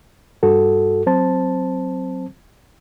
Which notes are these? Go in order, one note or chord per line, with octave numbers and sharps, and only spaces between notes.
G2 F#4 A4
F#3 C4 C5 A5